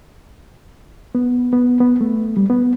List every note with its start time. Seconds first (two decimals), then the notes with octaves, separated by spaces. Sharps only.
1.15 B3
1.53 B3
1.80 B3
2.01 A3
2.37 G3
2.50 B3